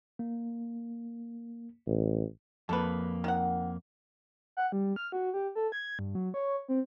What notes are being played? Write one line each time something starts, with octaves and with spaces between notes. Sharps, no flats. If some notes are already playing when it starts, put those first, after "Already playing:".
A#3
A1
F2 A#3 A4 B4
D#3 F#5
F#5
G3
F6
F#4
G4
A4
G#6
G2
F#3
C#5
C4